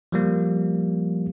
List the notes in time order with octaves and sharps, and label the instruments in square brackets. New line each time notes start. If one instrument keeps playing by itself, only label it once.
[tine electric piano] F3 G3 A#3